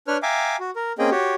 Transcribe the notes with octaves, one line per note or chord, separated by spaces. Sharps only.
D4 B4 C#5 F6
E5 F5 G5 G#5 A#5 D6
F#4
A#4
A#3 C4 C#4 G#4 D#5 G5
F#4 G4 C#5